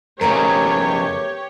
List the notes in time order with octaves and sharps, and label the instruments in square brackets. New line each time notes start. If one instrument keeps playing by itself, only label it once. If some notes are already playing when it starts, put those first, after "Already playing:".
[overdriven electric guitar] F2 C#3 [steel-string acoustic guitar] A3 B3 A#4 [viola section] G4 C#5 [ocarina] A#5